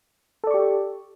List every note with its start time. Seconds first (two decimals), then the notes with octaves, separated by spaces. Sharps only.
0.44 A4
0.47 D5
0.51 C#6
0.54 G4